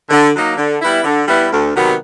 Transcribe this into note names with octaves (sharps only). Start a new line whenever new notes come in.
D3
F#3 A#3 D#4
D3
G3 B3 E4
D3
G3 B3 E4
D2
C3 D#3 F#3 B3